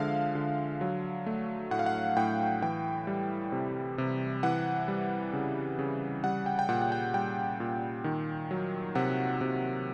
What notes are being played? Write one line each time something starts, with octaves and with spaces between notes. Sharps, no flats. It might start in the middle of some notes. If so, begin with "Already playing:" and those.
Already playing: D3 F3 G#3 E5 F5
D3
F#3
A3
A2 F#5
F5
F#5
A2 G5
E3 G5
G3
C3
C3
E3 F#5
G3
C#3
C#3
G3 F#5
G5
G5
A#2 F#5
F#5
G5
G3 G5
A#2
D#3
F#3
C3 F#5
C3